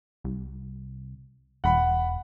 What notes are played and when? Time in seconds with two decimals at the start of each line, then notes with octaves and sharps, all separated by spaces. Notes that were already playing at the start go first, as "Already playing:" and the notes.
0.24 C2
1.64 E1 F#5 B5